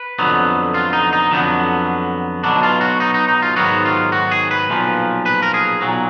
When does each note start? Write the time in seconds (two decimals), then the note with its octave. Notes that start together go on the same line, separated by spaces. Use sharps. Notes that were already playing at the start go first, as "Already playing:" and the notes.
Already playing: B4
0.19 F2 D3 F#3 B3
0.74 F4
0.93 D#4
1.13 D#4
1.31 F2 D3 F#3 B3
2.44 B1 B2 F#3 D4
2.63 F4
2.81 F#4
3.00 D#4
3.14 D#4
3.28 D#4
3.42 F4
3.56 G#2 D#3 F#3 B3 F#4
3.85 F4
4.12 F#4
4.31 G#4
4.51 B4
4.69 B1 A#2 F3
5.26 B4
5.42 A#4
5.54 G#4
5.81 B1 A#2 F#3